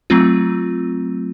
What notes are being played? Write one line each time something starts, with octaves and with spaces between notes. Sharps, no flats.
F#3 A3 C4 F4